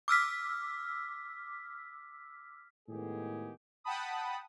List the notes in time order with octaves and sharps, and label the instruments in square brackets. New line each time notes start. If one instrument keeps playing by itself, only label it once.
[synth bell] D6 E6 F6 B6
[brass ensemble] A2 D#3 G#3 B3 G4 G#4
[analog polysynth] F#5 G5 A5 B5 D#6